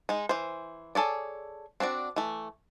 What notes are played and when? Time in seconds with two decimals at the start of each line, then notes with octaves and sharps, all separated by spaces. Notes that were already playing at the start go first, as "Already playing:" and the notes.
0.09 G#3 D#4
0.29 E3 C5
0.95 G#4 A4 C#5 D5
1.80 C4 D4 F#4 D5
2.16 E3 A3